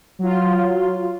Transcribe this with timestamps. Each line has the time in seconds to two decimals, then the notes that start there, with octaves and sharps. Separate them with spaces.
0.19 F#3 F4